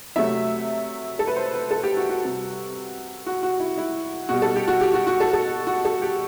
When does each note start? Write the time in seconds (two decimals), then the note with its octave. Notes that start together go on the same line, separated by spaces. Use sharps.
0.16 C3 F#3 A3 E5
1.19 A4
1.27 B4
1.36 C5
1.53 B4
1.71 A4
1.83 G4
1.97 F#4
2.10 F#4
2.22 C3 G3
3.26 F#4
3.43 F#4
3.60 E4
3.78 E4
4.29 B2 G3 F#4
4.42 A4
4.56 G4
4.68 F#4
4.81 G4
4.94 F#4
5.07 F#4
5.20 A4
5.33 A4
5.67 F#4
5.85 A4
6.02 G4